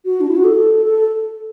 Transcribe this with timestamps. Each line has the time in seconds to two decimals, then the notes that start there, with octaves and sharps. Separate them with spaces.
0.05 F#4
0.21 D4
0.29 E4
0.36 F#4
0.44 A4
0.85 A4